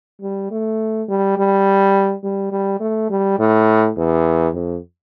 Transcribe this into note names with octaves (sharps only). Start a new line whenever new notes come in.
G3
A3
G3
G3
G3
G3
A3
G3
A2
E2
F2